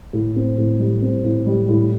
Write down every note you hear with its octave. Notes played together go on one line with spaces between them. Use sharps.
A2
C4
A2
G3
C4
A2
G3
A2